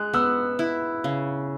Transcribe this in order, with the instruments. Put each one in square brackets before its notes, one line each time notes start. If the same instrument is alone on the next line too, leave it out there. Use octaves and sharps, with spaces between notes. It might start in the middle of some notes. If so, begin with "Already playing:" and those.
Already playing: [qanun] G#3 [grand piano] F#6
[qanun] B3 [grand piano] E6
[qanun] E4
C#3